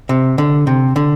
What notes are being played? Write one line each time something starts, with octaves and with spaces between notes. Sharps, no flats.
C3
D3
C3
D3